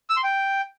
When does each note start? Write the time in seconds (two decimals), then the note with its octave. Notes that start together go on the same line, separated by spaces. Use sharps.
0.10 E6
0.17 C6
0.24 G5